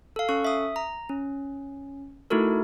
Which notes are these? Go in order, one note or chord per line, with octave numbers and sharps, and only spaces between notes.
A4 F5
C#4 A4 C#6
E5 D#6
A#5
C#4
A3 D#4 E4 F#4 A4 A#4